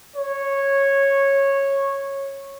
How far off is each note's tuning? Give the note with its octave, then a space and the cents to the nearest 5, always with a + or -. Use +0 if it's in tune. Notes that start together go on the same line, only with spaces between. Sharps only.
C#5 -10